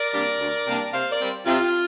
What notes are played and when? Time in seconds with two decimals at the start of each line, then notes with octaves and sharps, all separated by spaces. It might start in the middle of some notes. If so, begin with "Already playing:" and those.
Already playing: A#4 D5
0.13 C3 G3 A#3 D4
0.39 D2
0.66 C3 G3 A#3 D4
0.93 C3 C5 F5
1.11 A#4 D5
1.20 G3 C4
1.46 C3 F4